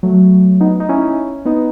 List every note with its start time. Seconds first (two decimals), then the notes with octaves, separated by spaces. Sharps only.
0.03 F#3 A3
0.61 B3 D#4
0.80 D#4
0.89 C#4 E4
1.45 B3 D#4